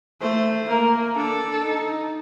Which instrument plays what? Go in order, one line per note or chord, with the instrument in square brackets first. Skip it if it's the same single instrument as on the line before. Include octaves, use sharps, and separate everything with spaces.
[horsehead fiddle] A3 [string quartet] C5
[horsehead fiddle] A#3 [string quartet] A#4
[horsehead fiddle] D4 [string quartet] A4
[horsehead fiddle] D#4